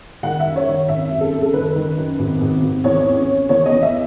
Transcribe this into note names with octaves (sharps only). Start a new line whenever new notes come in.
D#3 F#5
E5
F#2
C#5
D#3
G#1 E5
F#2
A4
F#2
A4
D#3 B4
D#3
F#2
G#1
G#1
G#1
E2 C#5
C#4
C#4
E2 C#5
D#5
E2
E5